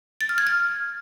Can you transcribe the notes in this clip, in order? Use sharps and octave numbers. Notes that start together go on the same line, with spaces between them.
A6
F6
G#6
F6